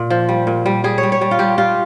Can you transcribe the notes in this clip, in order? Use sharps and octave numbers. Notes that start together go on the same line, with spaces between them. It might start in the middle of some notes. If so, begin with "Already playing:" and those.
Already playing: A#2
F3
G3
A#2
G3
G3 G#4
C#5
G3
C#5
G3
F4
G3 G4
G3 F4